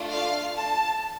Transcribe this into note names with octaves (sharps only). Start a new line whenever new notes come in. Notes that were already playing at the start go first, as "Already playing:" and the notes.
Already playing: A3 D4 F4
F5
A5